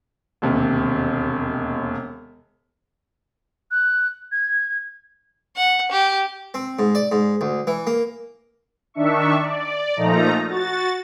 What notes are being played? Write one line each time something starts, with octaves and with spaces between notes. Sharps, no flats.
E1 D#2 C3
F#6
G#6
F#5
G4
C4
G#2
D5
G#2
D2
E3
A#3
D#3 D4 E5 C#6
D5
A#2 F3 A3 D#4 A#5
F#4 A6